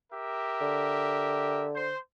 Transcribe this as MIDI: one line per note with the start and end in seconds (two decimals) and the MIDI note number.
0.12 1.68 67
0.12 1.68 70
0.12 1.68 76
0.61 1.92 50
1.75 1.98 72